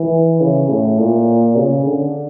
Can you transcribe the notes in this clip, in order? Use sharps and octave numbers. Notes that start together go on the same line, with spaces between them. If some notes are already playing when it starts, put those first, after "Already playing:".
Already playing: E3
C#3
A2
A#2
C#3
D3